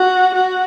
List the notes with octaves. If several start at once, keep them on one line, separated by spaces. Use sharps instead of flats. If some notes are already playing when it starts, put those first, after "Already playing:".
Already playing: F#4
F#4